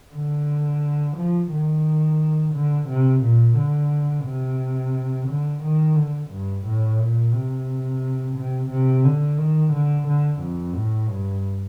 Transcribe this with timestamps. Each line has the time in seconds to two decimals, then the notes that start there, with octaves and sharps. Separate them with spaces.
0.14 D3
1.18 F3
1.52 D#3
2.54 D3
2.89 C3
3.22 A#2
3.57 D3
4.26 C3
5.28 D3
5.63 D#3
5.97 D3
6.31 G2
6.66 A2
7.00 A#2
7.33 C3
8.36 C3
8.71 C3
9.05 D3
9.38 D#3
9.73 D3
10.08 D3
10.41 F2
10.75 A2
11.09 G2